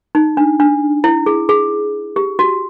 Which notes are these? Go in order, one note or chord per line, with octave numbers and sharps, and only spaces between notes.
D#4
D4
D4
E4
G#4
G#4
G4
F#4